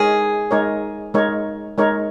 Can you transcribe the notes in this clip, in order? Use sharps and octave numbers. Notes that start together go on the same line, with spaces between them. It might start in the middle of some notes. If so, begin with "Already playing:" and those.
Already playing: G#3 D#4 G#4 A#4 C#5
G#3 D#4 A#4 C#5
G#3 D#4 A#4 C#5
G#3 D#4 A#4 C#5